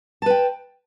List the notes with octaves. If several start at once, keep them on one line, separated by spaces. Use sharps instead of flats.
B4 G5 A5